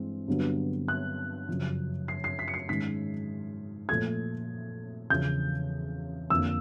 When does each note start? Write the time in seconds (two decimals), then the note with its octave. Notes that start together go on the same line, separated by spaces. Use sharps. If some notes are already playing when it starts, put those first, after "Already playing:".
Already playing: G2 E3 G#3 C4
0.28 G2 D3 F#3 B3
0.88 F#6
1.49 F#2 C#3 F3
2.08 C7
2.24 C7
2.39 B6
2.48 C#7
2.54 C7
2.69 G#2 D#3 G#3 C#4 B6
3.89 A#2 F3 A3 G#6
5.10 E2 C#3 F3 G6
6.30 F2 D3 F3 A#3 E6